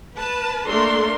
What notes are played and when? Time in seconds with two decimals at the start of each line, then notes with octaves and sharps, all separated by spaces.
0.15 B4 A5
0.67 A3 A#3 D4 A4 A#4 C6